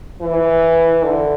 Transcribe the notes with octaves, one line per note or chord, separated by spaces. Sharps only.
E3
D3